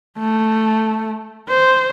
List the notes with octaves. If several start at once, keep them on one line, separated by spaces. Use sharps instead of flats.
A3
C5